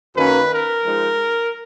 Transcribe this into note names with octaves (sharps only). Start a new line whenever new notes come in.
F#2 D#3 A#3 C#4 B4
A#4
F3 G#3 D#4